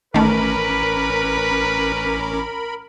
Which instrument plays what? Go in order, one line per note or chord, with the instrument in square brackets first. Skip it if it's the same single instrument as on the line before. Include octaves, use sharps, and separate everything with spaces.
[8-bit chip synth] A1 C#4 D6 [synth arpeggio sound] D#3 A3 [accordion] A#4 B5 [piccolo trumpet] B4